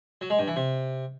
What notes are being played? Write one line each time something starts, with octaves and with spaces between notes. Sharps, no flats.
F#3
G#3
G2
E3
C3